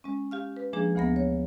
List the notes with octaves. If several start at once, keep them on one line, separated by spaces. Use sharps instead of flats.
G#3 C#4
G4 F5 F6
B4
F3 G#3 A#3 D4 G#4
D2 E3 A#3 B3 A#6
C#5